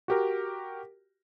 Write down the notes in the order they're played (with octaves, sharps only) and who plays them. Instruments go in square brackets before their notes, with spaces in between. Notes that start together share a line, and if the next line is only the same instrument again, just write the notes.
[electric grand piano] F#4 G4 A#4